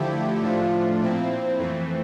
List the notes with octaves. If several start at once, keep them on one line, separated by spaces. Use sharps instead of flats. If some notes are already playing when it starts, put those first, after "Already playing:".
Already playing: D3 F3 A3 E4 G4
A2 F3 A3 D4 F4
A#2 F3 C4 E4
F2 E3 A3 C4